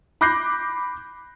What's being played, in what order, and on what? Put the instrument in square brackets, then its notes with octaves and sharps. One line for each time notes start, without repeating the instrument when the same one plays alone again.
[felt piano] B5 D6 F#6 G6 A#6 C7